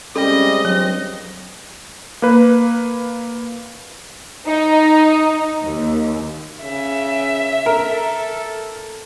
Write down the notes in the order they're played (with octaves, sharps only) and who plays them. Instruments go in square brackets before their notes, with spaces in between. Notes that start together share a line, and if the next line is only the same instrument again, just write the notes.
[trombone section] C3 G3 G#3 [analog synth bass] C#4 [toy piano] A4 [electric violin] D#5
[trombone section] G2 F3 C4 [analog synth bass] F#3 [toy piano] C#5
[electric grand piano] A#3 B4
[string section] D#4
D#2
[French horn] C#3 [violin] E5
[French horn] A4 [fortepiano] A#4